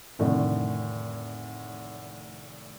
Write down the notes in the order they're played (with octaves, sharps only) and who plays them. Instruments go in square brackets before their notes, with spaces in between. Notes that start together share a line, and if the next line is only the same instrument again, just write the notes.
[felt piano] F1 A2 D3 D#3